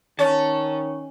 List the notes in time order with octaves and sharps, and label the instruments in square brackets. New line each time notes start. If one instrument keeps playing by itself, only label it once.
[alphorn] D#3 [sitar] C#4 [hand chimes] C#5 C#6 [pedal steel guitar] A5